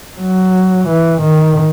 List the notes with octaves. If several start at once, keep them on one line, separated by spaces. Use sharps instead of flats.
F#3
E3
D#3